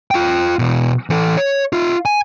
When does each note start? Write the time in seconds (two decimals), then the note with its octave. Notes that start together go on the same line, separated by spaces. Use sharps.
0.11 F4 G5
0.59 B2 E3
1.10 E3 A4
1.37 C#5
1.73 F4 E5
2.05 G#5